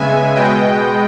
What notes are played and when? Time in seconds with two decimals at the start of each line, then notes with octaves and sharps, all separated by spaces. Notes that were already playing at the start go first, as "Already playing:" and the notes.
Already playing: C#3 G#3 B3 E5 G#5
0.36 B2 G#3 B3 D#5 G5